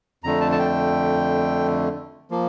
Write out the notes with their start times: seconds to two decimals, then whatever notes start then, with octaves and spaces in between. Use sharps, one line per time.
0.24 F2 D3 A3 A#5
0.41 A5
0.52 A5
0.59 G5
2.31 F3 A#3